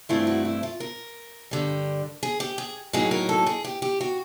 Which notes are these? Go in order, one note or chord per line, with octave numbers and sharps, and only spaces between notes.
G2 E3 A3 C4 E4 F4
F#4
E4
F4
A#4
G2 D3 G3
G#4
G4
G#4
A2 F#3 A#3 D#4 G#4
A#4
A4
G#4
G4
G4
F#4